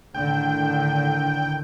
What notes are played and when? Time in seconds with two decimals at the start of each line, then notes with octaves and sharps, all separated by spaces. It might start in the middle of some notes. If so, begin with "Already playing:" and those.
0.15 A2 D3 D#3 G5